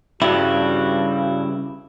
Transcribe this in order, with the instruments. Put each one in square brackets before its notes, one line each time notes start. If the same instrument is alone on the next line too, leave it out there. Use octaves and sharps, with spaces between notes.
[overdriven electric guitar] G2 [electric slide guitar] C#3 G4 [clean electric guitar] E4 [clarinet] F#4